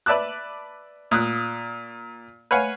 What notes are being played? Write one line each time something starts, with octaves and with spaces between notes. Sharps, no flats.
B4 D5 E5 A5 D6 F#6
A#2 D#6 F#6
B4 C#5 F5 F#5 G#5